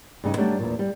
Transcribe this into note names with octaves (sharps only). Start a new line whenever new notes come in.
G2 C#3 D#4
F#3 G3 A3 D4
E2 A#2
G3